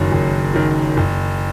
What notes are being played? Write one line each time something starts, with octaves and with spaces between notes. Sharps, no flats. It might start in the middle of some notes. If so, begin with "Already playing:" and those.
Already playing: F#1 F#2 D#3
F#1
F#2 D#3
F#1